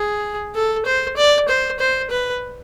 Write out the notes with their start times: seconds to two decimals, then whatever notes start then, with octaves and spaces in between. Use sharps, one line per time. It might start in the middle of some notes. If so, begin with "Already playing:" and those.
Already playing: G#4
0.55 A4
0.86 C5
1.17 D5
1.48 C5
1.79 C5
2.10 B4